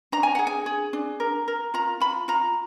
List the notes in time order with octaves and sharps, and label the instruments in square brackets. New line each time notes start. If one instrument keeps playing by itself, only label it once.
[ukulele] D4 A#5
G#5
G#4 F#5
G#5
G#4
D4
A#4
A#4
F4 A#5
F4 B5
F4 A#5